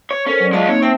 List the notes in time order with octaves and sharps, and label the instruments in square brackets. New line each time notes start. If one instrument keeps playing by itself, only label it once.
[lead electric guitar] C#5
[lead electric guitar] C#4 [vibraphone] A4 A#4 C5
[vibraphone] F#3 D5
[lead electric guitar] G#3 F4 [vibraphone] D#5 E5 A5
[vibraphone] A#3 C4 D#4 [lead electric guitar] C#5
[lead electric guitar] C4 [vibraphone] E5 G5 A5